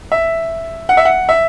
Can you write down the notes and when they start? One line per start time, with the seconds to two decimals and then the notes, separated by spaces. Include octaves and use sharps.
0.12 E5
0.89 F#5
0.97 E5
1.05 F#5
1.29 E5